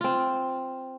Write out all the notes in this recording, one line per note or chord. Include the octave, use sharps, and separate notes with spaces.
C4 F4